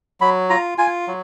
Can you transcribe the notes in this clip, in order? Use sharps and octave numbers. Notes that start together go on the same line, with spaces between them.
F#3 B5
F4 A#5
F4 G#5
F#3